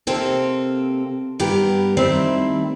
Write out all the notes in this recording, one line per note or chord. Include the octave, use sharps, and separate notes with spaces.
C3 A#3 C4 A4
G2 B3 G4 A#4
D#3 G3 A3 C4 E4